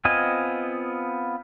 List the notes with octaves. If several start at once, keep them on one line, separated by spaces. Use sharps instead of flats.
B3 C4 F4 D#5 G#5